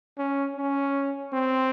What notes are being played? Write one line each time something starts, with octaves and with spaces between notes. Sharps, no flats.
C#4
C#4
C4